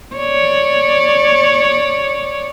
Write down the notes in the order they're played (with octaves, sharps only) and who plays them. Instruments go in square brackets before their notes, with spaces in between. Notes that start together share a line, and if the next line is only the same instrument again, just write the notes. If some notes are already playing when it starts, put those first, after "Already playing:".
[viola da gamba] C#5 D5